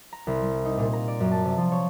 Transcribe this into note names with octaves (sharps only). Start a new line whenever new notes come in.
A#5
C2
G3
D#4
A#2
A#5
D5
F#2
A5
C3
F3
C#5